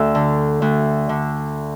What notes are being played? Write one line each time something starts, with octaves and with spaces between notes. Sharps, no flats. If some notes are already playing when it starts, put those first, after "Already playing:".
Already playing: D2 A4
D3
D2
D3